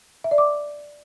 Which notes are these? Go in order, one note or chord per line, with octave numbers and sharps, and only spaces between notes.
E5
D5
D6